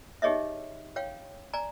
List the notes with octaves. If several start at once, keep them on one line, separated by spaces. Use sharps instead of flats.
D#4 G4 G#4 C#5 D#5 E5
C#5 F5 G5
D5 G#5 A#5